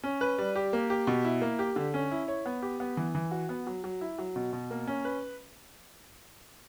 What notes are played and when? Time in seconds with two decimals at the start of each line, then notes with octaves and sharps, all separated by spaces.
0.04 C#4
0.21 B4
0.38 G3
0.56 G4
0.73 A#3
0.90 G4
1.07 B2
1.25 E4
1.41 A#3
1.59 G4
1.76 D3
1.94 C#4
2.11 E4
2.28 C#5
2.46 B3
2.62 G4
2.80 B3
2.97 E3
3.15 E3
3.31 F#4
3.49 B3
3.67 F#3
3.84 F#3
4.01 E4
4.19 F#3
4.36 B2
4.53 B2
4.71 A#3
4.87 C#4
5.05 B4